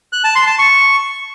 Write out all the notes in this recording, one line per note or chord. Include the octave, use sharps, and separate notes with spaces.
F#6
A5
C6
A5
C#6